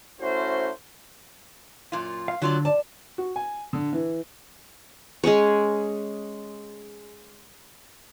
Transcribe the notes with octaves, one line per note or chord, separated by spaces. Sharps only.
A3 C#4 E4 F#4 C5
F#2 A#2 F4
F5
D3 F#3 F4 D5
D5 A5
F#4
G#5
D3
E3
G#3 C#4 G#4 C#5